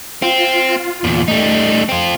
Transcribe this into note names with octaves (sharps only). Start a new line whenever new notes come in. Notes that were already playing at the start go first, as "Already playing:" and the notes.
C4 F4
E2 A#2
G3 A3 D#4
C4 F4